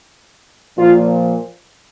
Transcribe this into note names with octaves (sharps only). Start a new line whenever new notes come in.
A#2 F3 F4